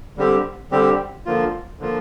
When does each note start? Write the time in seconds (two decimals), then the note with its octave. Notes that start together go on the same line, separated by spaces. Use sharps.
0.17 D3 G3 C4 G4
0.71 D3 G3 C4 G4
1.26 D3 F3 A#3 F4
1.79 D3 F3 A#3 F4